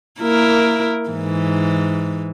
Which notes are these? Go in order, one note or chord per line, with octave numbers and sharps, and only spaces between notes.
A#3 E4 A#4
G#2 E3